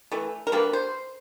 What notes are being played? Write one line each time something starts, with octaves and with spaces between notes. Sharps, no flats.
E3 A3
A#4
D3 G3 A#3 B4
C5